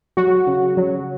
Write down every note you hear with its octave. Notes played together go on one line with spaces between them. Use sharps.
F#3 F#4
C#3
F#3